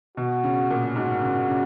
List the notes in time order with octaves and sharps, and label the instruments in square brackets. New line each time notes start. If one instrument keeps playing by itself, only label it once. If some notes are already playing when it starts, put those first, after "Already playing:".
[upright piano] B2 [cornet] F#4
[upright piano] C#3
A#2
[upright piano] G#2 [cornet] F#4
[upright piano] C#3
C#3